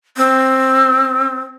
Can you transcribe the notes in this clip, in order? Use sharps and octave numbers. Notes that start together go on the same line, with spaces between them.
C4